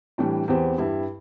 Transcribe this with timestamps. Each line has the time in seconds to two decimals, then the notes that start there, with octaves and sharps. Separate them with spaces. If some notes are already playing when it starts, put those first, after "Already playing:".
0.18 A2 E3 G3 D4
0.48 E2 E3 C4 G4 C5
0.78 G2 G3 E4